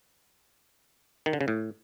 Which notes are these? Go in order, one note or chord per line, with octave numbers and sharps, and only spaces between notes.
D#3
D3
C#3
A2